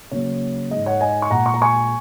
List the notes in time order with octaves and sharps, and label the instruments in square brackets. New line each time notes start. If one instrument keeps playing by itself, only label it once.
[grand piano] C#3 F#3 A#3 C#5
G#2 G#3 D#5
C#5 F#5
D#5 G#5
C#6
A#2 G#3 F#5 A#5
C#6
A#5
G#5 C#6